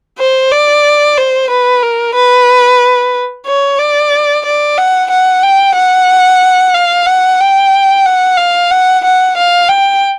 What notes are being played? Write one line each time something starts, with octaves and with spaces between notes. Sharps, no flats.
C5
D5
C5
B4
A#4
B4
C#5
D5
D5
F#5
F#5
G5
F#5
F5
F#5
G5
F#5
F5
F#5
F#5
F5
G5